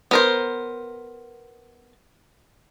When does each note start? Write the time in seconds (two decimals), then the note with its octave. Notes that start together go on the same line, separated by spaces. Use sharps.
0.11 B3 A#4 C5